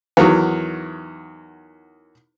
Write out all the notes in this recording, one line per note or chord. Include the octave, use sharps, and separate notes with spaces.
E2 D#3 F#3